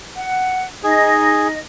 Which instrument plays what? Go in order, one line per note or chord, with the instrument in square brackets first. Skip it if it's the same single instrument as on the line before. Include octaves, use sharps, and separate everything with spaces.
[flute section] F#5
[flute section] D#4 D#5 [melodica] G#4